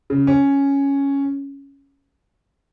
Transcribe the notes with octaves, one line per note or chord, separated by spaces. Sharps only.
C#3
C#4